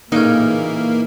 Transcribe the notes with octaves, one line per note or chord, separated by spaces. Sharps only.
A1 A#2 C#3 E3 A#3 C#4 D#4